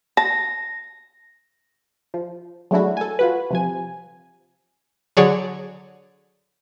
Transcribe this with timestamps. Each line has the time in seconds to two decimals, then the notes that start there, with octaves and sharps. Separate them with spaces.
0.17 A5 A#6
2.14 F3
2.71 F#3 G#3 A3 D4 E4 F#4
2.97 A4 G#5
3.19 F4 F#4 B4
3.51 C3 F3 G#5
5.17 D3 F#3 G#4 C#5 D5